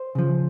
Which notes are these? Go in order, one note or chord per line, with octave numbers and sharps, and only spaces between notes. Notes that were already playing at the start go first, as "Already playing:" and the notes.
Already playing: C5
C#3 F3